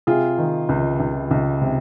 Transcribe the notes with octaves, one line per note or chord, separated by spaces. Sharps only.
C3 F4 G#4
D#3
C#2
C#2
C#2
C3